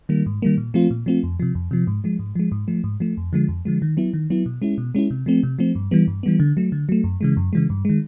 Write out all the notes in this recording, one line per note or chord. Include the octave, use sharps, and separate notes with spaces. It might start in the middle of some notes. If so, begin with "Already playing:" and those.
D#3 G3 A#3
G#2
D#3 G3 A#3
A#2
F3 A3 C4 F4
A#2
F3 A3 C4 F4
F2
C3 F3
F2
C3 F3
G#2
F3 G#3
G#2
F3 G#3
G#2
F3 A3
G#2
F3 A3
F2
D3 F3 G#3
F2
D3 F3 G#3
D#3
F#3 B3 E4
D#3
F#3 B3 E4
B2
G#3 C#4 E4
B2
G#3 C#4 E4
C3
F3 A3 C4
C3
F3 A3 C4
G2
E3 G3 B3
G2
E3 G3 B3
D3
F#3 A3
D3
F#3 A3
F#2
C#3 E3 G#3
F#2
C#3 E3 G#3
G2
D#3 G#3